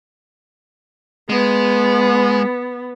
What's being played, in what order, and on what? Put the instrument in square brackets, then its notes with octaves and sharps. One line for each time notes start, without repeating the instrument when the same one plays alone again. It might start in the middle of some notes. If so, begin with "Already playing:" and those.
[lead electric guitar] G#3 [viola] B3